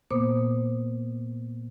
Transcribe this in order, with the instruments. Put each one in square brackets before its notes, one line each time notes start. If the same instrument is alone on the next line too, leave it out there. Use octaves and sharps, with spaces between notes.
[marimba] A#2 A#3 B3 C5 D6 D#6